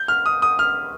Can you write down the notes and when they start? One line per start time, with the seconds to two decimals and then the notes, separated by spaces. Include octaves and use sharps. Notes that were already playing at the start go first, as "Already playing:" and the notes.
Already playing: G6
0.08 F6
0.26 D#6
0.42 D#6
0.59 F6